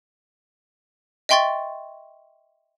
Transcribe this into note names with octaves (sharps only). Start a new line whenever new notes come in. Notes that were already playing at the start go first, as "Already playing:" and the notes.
D#5 E5 G5 C6 C#6 A6